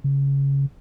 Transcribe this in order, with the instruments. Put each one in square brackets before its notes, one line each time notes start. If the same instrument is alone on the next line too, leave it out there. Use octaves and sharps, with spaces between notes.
[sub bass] C#3